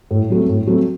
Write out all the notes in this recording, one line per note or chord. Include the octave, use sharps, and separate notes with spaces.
A2
F#3 A3 C4
A2
F#3 A3 C4